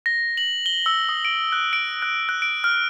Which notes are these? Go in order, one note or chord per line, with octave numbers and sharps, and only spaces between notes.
A#6
F#7
G7
E6
D#6
D7
F#6
D7
F#6
F#6
D7
F6